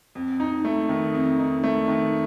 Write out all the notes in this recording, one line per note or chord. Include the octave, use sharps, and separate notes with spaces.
F2
D#4
A3
D#3
F2
D#4
A3
D#3